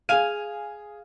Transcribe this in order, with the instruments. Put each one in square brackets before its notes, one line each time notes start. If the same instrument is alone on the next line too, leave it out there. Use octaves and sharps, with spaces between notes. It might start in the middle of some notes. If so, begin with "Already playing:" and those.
[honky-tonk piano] G#4 D#7 [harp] F5 G#5